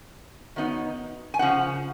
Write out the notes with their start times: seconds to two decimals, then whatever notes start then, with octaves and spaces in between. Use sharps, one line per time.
0.56 D#3 F#3 B3 D#4
1.34 G#5
1.39 C#3 F3 B3 D#4 F#5